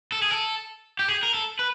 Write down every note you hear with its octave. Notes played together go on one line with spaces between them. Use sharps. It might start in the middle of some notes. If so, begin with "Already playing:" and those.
A4
G#4
A4
G4
G#4
A#4
A4
B4